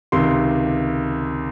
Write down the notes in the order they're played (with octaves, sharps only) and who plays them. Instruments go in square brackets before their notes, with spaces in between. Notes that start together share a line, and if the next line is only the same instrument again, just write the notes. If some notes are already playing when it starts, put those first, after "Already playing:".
[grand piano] C#2 C3 D#3 C6